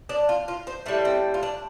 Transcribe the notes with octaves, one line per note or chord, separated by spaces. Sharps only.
D4
F4
F4
C5
A2 G3 A3
C4
F4
D4